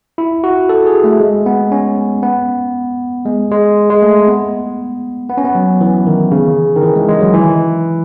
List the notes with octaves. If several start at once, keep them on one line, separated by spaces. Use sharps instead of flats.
E4
F#4
A4
G#4
A3
G#3
B3
C#4
B3
G#3
G#3
G#3
A3
B3
B3
C#4
B3
F#3
E3
D#3
C#3
D#3
E3
G#3
G#3
F#3
E3